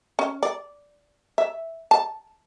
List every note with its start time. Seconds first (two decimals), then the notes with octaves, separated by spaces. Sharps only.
0.19 C#4
0.43 D5
1.38 E5
1.91 A5